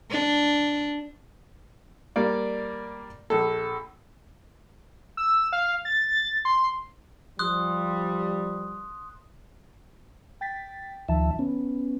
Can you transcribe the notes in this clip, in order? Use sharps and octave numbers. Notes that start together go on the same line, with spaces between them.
D4
G3 A#3 D5
A#1 A4
E6
F5
A6
C6
F3 G3 C6 D#6 F#6
G5 A6 B6
D2 D#3 F3 E5 A5
B3 C#4